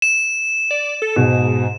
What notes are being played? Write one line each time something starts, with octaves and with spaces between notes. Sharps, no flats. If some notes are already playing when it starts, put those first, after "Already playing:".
E7
D5
A4
G#2 B2